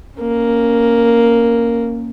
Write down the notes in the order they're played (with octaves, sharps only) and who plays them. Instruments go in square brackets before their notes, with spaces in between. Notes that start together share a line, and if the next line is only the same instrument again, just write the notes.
[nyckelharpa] A#3 C#4